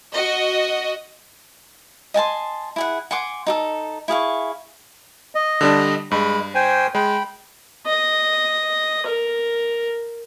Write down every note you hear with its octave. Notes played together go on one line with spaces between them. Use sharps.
F#4 D#5
D#5 G#5 A5 C6
E4 G#4 F#5
F#5 G#5 C6 D6
D#4 G4 A4
E4 G#4 F5 C#6
D#5
D3 G3 D4
G2 G#3 B5
C5 G5 G#5
G#3 G5 B5
D#5
A#4